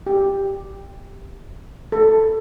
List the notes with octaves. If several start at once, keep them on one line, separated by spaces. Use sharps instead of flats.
G4
A4